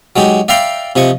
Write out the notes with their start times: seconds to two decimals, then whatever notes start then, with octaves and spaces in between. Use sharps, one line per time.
0.16 F#3 G#3 D#4 G4
0.48 D5 E5 F5 G5 A#5 C6
0.96 C3 F3 D#5 C#6